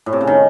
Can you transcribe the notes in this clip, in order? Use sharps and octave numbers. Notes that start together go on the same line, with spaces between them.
A2
C3
C#3
D#3